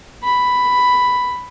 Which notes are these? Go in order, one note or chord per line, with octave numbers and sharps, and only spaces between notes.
B5